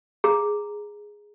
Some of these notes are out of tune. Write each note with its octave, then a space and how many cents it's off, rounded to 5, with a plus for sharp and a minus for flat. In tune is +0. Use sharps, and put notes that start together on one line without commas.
G#4 +0 A#5 +0